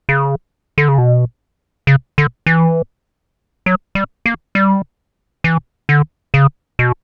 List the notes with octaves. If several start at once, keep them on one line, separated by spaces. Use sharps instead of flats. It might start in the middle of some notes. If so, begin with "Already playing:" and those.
C#3
D3
C#3
B2
C#3
D3
E3
F#3
G3
A#3
G3
E3
D3
C#3
B2